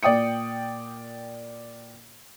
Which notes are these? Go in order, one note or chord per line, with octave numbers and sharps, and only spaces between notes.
A#2 D5 G5 D#6 C#7